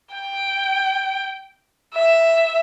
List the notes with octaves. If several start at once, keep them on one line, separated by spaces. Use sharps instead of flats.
G5
E5